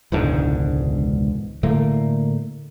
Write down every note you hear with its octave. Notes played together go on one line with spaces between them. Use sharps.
E1 C#2 G#2 D3
A2 D3 A3 A#3